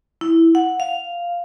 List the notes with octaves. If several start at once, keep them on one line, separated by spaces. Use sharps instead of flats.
E4
F#5
F5